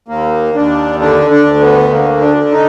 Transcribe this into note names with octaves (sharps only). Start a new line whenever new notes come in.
D#2 A#3
D#2 D4
D3 D4
D4
D2
B3
D3 A#3
D4
D3
D#4